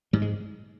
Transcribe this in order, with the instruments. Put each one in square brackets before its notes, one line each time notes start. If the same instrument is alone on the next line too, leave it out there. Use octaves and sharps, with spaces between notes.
[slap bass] G#2 G3
G#3